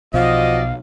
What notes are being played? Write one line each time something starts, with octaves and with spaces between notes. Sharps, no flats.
B1 B2 F3 F#4 D5 D#5 F5